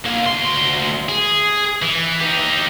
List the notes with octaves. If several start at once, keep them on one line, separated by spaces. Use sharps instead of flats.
D3 A#3
D2 C6
G#4
E3
D#4 G4